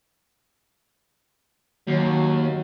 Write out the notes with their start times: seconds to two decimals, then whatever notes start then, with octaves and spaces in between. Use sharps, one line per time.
1.87 D#2 F#3